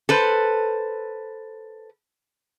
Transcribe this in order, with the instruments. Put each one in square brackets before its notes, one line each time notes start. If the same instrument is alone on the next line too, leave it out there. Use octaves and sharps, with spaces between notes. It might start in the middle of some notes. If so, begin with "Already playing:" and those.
[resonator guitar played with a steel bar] A4 B4 C5